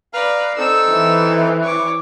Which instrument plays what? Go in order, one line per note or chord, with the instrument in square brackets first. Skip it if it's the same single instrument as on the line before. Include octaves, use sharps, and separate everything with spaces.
[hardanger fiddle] B4 [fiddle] D5 A#5 [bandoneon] F5 F6
[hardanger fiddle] C4 [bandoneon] D#4 A4 [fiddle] E6
[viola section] E3
[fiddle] C#5 D6